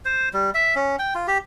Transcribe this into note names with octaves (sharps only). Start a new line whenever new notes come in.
C5
G3
E5
C#4
G5
F4
G4